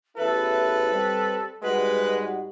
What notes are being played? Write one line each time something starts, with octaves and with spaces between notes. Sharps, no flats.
A1 E2 E4 A4 B4
G3 C4
G#2 G3 G#3 F#4 B4